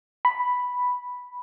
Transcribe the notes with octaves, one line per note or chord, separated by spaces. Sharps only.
B5